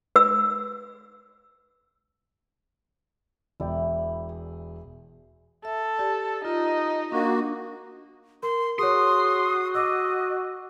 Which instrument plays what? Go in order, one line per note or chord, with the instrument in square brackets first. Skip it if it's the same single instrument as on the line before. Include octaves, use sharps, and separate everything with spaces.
[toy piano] B4 E6
[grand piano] E1 D5 G5 [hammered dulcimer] E4
[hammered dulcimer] G#4
[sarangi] A4 [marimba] E5
[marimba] G4 D5
[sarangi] D#4 [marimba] F4
[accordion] A#3 F#4 [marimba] D4
[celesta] A#4 [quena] C6
[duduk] F#4 [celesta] G#4 C#5 [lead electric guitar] C6 [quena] D#6
[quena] D#5 [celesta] D6 E6